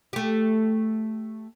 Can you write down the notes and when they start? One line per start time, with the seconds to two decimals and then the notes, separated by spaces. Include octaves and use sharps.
0.13 A3 G4